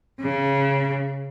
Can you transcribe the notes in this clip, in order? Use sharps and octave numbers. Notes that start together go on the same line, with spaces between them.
C#3